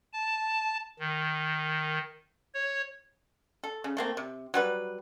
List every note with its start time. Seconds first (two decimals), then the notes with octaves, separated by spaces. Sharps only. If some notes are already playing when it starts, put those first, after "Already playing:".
0.13 A5
0.99 D#3
2.54 C#5
3.64 A4
3.84 C#3
3.97 A3 A#3 C4
4.17 C3
4.54 F#3 G3 B4